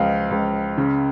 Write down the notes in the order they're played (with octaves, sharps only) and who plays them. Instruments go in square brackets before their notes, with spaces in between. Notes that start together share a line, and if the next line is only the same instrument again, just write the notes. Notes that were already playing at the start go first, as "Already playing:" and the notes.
Already playing: [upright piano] C#2 F3 D#5 F5
C#2
C#3